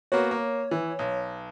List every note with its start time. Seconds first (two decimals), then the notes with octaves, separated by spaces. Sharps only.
0.12 A#3 B3 F#4 C#5
0.31 A#3
0.71 E3
0.99 B1